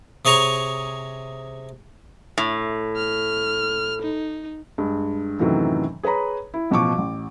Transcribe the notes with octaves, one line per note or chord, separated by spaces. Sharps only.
C3 G#4 C#5 G#5 A#5 C#6
A2
F6
D#4
G2 G#3
F#2 A2 C3 D#3 E3 F#3
G#4 B4 C#5 A#5 B5
E4
A1 B2 F3 C#6 D6
A1